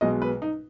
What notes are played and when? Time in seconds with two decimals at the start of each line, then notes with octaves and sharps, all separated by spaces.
0.01 B1 B2 G#3 D#5
0.22 B4
0.42 D#4